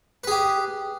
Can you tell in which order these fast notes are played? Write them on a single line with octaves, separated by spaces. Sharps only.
B4 G#4 G4